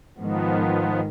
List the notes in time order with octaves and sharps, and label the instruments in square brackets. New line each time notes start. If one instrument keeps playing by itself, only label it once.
[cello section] G#2 D#3 [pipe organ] F3 B3